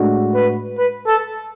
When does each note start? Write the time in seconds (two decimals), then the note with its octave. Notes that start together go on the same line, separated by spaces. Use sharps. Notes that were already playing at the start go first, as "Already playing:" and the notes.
Already playing: A2 G#3 D4 F#4
0.35 B4
0.78 B4
1.07 A4